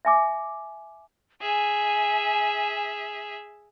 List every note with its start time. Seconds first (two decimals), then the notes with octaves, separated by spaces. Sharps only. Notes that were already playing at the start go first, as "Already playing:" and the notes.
0.05 E5 G#5 D6
1.41 G#4 E5 G#5